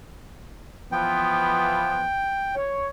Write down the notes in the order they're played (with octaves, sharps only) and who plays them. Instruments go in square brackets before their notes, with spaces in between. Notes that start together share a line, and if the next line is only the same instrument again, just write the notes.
[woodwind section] E3 F3 B3 [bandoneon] G5
[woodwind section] C#5